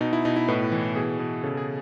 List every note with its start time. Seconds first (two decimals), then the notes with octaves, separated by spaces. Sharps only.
0.01 B2 D#4
0.13 E4
0.25 B2 D#4
0.36 E4
0.48 A2 B4
0.72 E3
0.96 B2 G#4
1.19 B2
1.44 C#3 A4
1.57 G#4